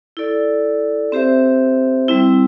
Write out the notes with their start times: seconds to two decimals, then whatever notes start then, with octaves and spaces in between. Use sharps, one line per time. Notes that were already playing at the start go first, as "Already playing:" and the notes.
0.17 E4 A4 D5
1.12 C4 G4 C5 E5
2.08 G3 C4 E4